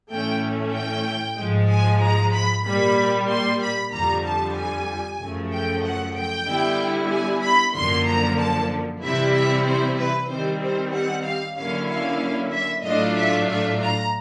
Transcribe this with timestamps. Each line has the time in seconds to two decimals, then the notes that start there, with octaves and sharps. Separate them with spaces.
0.11 A2 E3 A3 C#4 G5
0.74 G5
1.38 G#2 F3 G#3
1.70 G#5
2.02 A#5
2.34 B5
2.66 A#2 G3 A#3 B5
3.29 C6
3.61 B5
3.93 F2 D3 G3 A#5
4.25 A5
4.57 G#5
5.20 F#2 C#3 F3 A3
5.52 G5
5.84 F#5
6.15 G5
6.48 D3 G3 B3 E4
7.11 G#5
7.43 B5
7.75 F#2 D3 F3 A#3 C6
8.07 A#5
8.39 A5
9.02 C3 E3 G3 C4 E4 E5
9.34 E5
9.66 C5
9.97 B4
10.29 D#3 G3 C4 C5
10.61 C5
10.94 F#5
11.24 F5
11.57 D3 F#3 A#3 C#4 E4 F5
11.88 F5
12.52 E5
12.83 A2 F#3 A3 D4 F4 D#5
13.16 E5
13.48 E5
13.80 A#5